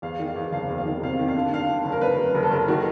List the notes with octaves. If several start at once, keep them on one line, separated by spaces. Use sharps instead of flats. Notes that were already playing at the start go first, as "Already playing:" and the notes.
E2 F5
D#3
F5
E2
F#1 F5
E2
F5
D#3
C3 F5
D#3
F5
D3
D3 F5
D3
F#1
A#4
F#1 B4
F#1
F#1 A#4
A4
F#1 A#4
D#3 F#4